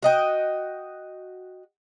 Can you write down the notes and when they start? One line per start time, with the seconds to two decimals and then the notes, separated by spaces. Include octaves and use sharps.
0.02 F#4 D#5 G5